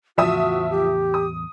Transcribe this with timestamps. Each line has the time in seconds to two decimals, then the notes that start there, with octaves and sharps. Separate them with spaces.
0.18 E2 A2 C#3 F3 F#4 E5 D#6
0.70 G4
1.14 D#6